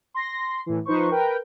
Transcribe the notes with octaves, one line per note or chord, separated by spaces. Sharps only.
C6 A#6
C6
A2 E3
F3 D#4 B4 C5 C#6
A#4 B4 G5